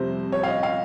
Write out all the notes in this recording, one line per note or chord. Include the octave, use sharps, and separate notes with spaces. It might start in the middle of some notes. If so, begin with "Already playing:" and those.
Already playing: F2 C3 G3 C5
C#5
F5
D#5
F5